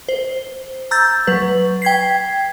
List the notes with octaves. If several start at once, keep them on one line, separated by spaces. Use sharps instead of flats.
C5
A#5 E6 G6 A6
F#3 B4
G5 G#6 B6 C7